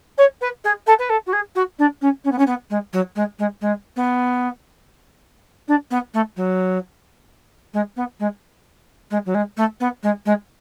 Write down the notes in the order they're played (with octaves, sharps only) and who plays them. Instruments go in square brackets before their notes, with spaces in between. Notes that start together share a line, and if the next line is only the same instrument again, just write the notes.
[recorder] C#5
B4
G#4
A4
B4
A4
F#4
G#4
F#4
D4
C#4
C#4
B3
C#4
B3
G#3
F#3
G#3
G#3
G#3
B3
D4
B3
A3
F#3
G#3
B3
G#3
G#3
F#3
G#3
A3
B3
G#3
G#3